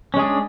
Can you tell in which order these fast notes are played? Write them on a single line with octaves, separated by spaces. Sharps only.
C#4 G#3 G#4 D4